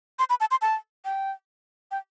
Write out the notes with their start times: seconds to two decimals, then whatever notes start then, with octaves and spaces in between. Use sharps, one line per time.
0.19 C6
0.30 B5
0.40 A5
0.51 C6
0.62 A5
1.05 G5
1.91 G5